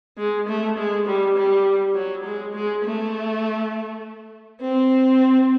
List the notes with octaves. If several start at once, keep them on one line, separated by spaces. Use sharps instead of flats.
G#3
A3
G#3
G3
G3
F#3
G#3
G#3
A3
C4